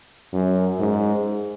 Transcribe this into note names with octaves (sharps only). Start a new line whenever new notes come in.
F#2
G#2